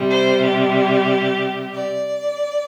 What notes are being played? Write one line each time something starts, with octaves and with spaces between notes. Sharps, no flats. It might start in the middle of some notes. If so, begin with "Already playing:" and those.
Already playing: C3 G3
C5
G4
D5